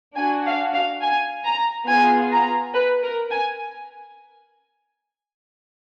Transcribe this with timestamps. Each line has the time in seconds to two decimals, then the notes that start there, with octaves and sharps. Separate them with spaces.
0.16 D4 F#4 G#5
0.45 F5
0.74 F5
1.02 G#5
1.45 A#5
1.87 B3 F4 G#4 G#5
2.31 A#5
2.74 B4
3.03 A#4
3.31 G#5